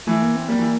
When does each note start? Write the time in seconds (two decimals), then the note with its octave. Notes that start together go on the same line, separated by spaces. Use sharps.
0.07 E3 A3
0.22 A#3
0.36 C4
0.48 G3 A#3
0.59 E3